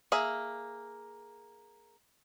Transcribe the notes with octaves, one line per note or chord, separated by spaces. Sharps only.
A#3 G#4 E5